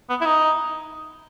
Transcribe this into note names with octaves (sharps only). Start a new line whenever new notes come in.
B3
E4
D#4